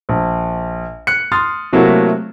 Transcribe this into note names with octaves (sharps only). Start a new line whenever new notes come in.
A#1
F#6 C#7
C6 D#6 F6 A6
C3 F#3 A3 A#3 E4 F#4